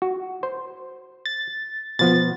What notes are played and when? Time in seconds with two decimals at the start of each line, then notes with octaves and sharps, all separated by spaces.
0.02 F#4
0.43 C5
1.26 A6
1.99 B2 F3 B3 A6